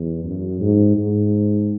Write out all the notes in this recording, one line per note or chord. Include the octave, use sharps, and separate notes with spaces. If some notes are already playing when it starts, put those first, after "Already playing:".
Already playing: E2
F#2
G#2
G#2